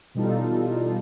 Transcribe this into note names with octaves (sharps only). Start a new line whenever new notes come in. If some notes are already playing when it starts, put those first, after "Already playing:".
B2 E3 G3 D#4 F4 A4